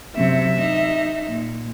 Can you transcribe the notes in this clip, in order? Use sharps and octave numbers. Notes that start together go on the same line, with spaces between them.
F#2 C3 E5
D#4
A#2